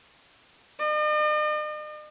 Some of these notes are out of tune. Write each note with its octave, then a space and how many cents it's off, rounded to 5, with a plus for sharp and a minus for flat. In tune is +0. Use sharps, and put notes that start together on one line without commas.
D#5 -45